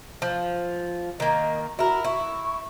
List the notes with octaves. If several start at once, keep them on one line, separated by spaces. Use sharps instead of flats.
F3
D#3 A#3 D#5
E4 F#4 A#4
E4 C#6